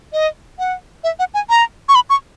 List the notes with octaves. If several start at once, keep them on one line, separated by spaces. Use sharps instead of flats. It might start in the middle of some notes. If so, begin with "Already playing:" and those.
D#5
F#5
E5
F#5
G#5
A#5
C#6
B5
C#6